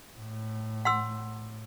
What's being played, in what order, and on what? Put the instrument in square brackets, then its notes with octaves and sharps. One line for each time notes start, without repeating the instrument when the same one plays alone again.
[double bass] A2
[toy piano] F#5 C6 E6